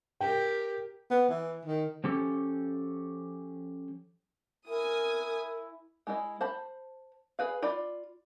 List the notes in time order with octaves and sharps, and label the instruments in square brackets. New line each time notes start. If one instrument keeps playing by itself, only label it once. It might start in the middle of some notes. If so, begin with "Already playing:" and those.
[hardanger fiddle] G4 A#4 [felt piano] G5
[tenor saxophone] B3
E3
D#3
[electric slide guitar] F3 C#4 G4 A4
[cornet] E4 [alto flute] A#4 [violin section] G#5 D#6
[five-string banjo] G#3 E4 D#5
C5 A5 B5
G#4 B4 F5
F4 D5 B5